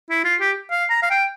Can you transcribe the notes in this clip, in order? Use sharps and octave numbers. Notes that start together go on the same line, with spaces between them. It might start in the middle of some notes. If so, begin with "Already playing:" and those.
E4
F4
G4
F5
A#5
F5
G5